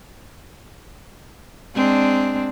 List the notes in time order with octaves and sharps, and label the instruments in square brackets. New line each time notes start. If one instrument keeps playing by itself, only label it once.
[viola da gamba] G#3 C4 D4